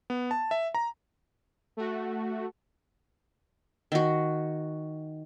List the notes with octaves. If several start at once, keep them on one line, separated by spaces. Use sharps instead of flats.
B3
A5
E5
A#5
A3 F#4
D#3 F#4